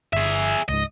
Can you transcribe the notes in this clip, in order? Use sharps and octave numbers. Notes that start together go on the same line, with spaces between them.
G1 G#4 E5
C#2 G#2 D#5